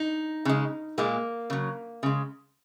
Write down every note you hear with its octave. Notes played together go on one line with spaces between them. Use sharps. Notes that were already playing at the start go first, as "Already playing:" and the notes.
Already playing: D#4
C#3 G#3
A#2 G#3 A#3
C#3 F#3
C#3 G#3